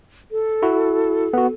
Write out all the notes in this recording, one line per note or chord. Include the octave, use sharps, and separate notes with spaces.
A4
E4 F#4
B3 F#4